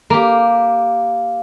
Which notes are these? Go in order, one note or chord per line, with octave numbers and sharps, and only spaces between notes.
A#3 G4